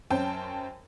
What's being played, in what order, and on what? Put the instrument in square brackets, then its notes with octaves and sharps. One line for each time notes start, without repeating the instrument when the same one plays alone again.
[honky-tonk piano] F#2 C#4 C5 G5 A5